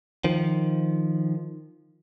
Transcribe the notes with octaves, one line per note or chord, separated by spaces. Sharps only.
D#3 F3